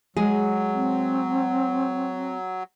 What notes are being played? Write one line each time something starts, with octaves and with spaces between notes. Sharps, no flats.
F#3 G#3 G#4
C4